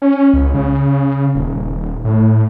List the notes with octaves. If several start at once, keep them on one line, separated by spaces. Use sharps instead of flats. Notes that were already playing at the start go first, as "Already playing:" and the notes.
C#4
C#2
C#3
D#1
A2